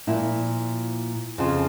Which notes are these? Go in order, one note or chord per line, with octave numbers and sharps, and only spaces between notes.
A#2 F3 E4
F2 C#3 F3